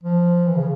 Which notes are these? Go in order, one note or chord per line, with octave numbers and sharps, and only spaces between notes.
F3
E3
C#3